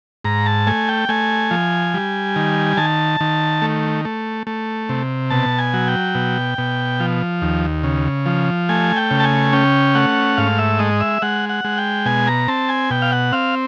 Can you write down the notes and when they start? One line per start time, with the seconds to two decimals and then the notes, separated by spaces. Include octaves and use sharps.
0.24 G#2 A#5
0.46 A5
0.67 A3 G#5
0.89 G5
1.09 A3 G#5
1.51 F3
1.94 G3
2.36 D#3
2.77 D#3 A5
3.20 D#3
3.62 A3
4.05 A3
4.47 A3
4.89 C3
5.30 B2 A5
5.59 G#5
5.74 F#3
5.88 G5
6.15 B2
6.58 B2
7.00 F3
7.42 D#2
7.84 C#3
8.26 F3
8.69 A3 G#5
8.96 G5
9.11 C#3
9.20 A5
9.24 G#5
9.53 C#4 G5
9.95 A3 F#5
10.37 G#2 F5
10.58 E5
10.79 G#3 D#5
11.00 E5
11.22 G#3 F#5
11.49 F#5
11.65 G#3
11.78 G5
12.06 B2 G#5
12.27 A#5
12.48 C4 A5
12.69 G#5
12.90 B2 G5
13.02 F5
13.12 F#5
13.32 C4 F5